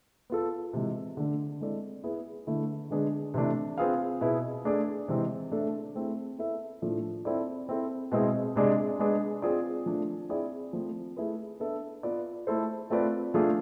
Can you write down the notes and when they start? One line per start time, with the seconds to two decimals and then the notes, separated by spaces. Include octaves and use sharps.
0.30 B3 F4 A4
0.73 C3 E3 G#3
1.17 D3 A3 D4
1.61 G#3 C4 E4 A4 D5
2.04 B3 E4 G#4
2.47 D3 A3 E4
2.90 D3 G#3 B3 D4 G#4
3.34 C3 E3 A3 D4
3.78 C4 F4 G#4 B4 F5
4.21 B2 B3 E4 G#4
4.65 A3 D4 G#4 D5
5.08 C3 E3 G#3 C4
5.52 A3 D4 A4 E5
5.95 A3 C4 E4 G#4
6.38 B3 E4 A4 E5
6.82 A2 F3 A3 D4 F4
7.25 C4 E4 A4 D5
7.69 C4 E4 A4
8.12 B2 G#3 C4 E4 G#4
8.56 C3 G#3 D4 G#4 D5
8.99 G#3 B3 D4 G#4
9.42 C4 F4 G#4 D5
9.86 F3 A3 D4
10.29 C4 E4 G#4 D5
10.73 F3 A3 C4
11.16 A3 E4 G#4 B4
11.60 B3 D4 A4 E5
12.03 B3 F4 B4 D5
12.47 A3 E4 A4 C5
12.90 A3 C4 F4 B4 D5
13.34 F3 A3 D4 F4 G#4